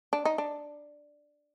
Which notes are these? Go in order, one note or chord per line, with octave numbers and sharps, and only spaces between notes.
D4
D#4
D4